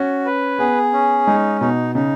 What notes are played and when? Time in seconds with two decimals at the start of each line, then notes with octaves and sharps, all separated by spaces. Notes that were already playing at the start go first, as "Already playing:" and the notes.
Already playing: C#4 F#4
0.25 B4
0.59 B3 G#4
0.93 C#4
1.27 G#3 D#4
1.61 B2 D#4
1.95 C#3 D#4